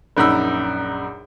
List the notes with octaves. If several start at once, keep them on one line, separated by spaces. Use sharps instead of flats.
A#1 F#2 D#4 B5 E6